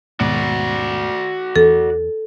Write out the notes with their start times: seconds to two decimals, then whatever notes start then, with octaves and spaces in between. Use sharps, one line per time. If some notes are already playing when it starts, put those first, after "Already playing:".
0.20 D#2 G#2 B2 F#4 D5
1.56 E2 E3 A4